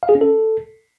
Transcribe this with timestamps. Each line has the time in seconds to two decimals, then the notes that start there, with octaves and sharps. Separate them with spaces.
0.03 F5
0.09 G#4
0.15 C#4
0.21 A4